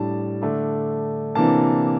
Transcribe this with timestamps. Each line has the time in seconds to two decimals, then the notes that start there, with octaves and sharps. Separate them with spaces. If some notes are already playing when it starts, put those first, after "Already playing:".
Already playing: A2 G3 D4 A5
0.42 D3 A3 D4
1.35 C3 E3 A#3 D4 A5